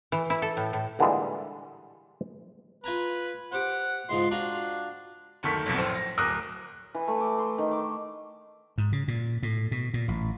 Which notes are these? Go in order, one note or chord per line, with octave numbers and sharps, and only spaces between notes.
E3
E4
A4
A2
A2
A#2 D3 E3 G3 G#3
F4 B4 G#5 A#5
G4 C5 F#5
C#2 G#2 F3 C6
D4 F4 F#4 A#5
F#1 D2 D#3 A4 C#6 B6
B1 F2 B2
F1 A2 C5
A#6
D1 A#4 D6 D#6 F#6 A#6
E3
A3
D6
C6
D#3
D6
G#2
C#3
A#2
A2
B2
A#2
A1